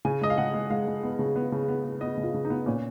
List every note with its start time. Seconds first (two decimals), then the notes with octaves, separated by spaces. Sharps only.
0.05 C#3 G#5
0.21 G#3 D#5
0.30 F5
0.38 C#3 F#5
0.54 G#3
0.70 G#3 F5
0.87 G#3
1.03 B3
1.19 C#3
1.36 B3
1.52 C#3
1.68 B3
1.85 B3
2.01 B3 D#5
2.17 C#3
2.23 F4
2.34 C#3
2.45 D#4
2.50 B3
2.66 A#2 C#4